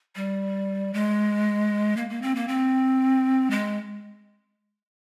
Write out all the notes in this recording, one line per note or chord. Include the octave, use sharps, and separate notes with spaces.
G3
G#3
A#3
A#3
C4
A#3
C4
G#3